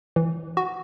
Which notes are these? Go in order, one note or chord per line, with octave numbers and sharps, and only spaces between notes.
E3
F#4